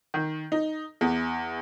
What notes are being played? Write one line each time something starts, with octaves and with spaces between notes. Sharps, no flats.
D#3
D#4
E2